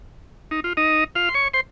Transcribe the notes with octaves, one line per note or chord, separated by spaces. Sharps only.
D#4
F4
D#4 D#5
F4 F5
C6
C#5 C#6
C5 C6